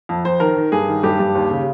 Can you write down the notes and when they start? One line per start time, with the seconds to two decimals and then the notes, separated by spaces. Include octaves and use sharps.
0.09 F2
0.25 F2 C5
0.40 D#3 A#4
0.56 D#3
0.72 G2 G#4
0.88 D#3
1.03 G2 G4
1.20 G2
1.35 D#2
1.51 C#3